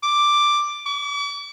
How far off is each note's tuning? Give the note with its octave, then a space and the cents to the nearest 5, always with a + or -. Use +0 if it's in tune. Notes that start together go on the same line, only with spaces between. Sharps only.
D6 +5
D6 -45